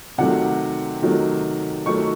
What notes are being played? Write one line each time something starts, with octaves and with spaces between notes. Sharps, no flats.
C3 D#3 F#3 A3 F#5
C3 D#3 F#3 A3
D#3 F#3 A3 C#6